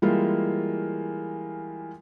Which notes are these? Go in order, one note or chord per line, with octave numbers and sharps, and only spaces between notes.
E3 G3 G#3 A#3 F4